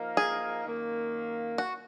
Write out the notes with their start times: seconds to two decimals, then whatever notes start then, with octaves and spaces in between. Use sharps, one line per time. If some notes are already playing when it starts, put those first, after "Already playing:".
Already playing: F3 A#3 D#4 A#4 F5
0.17 G#4
0.64 F#2 D#3 A#3
1.58 F#4